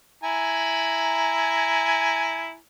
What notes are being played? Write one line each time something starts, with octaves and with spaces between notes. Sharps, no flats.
E4 G#5 A#5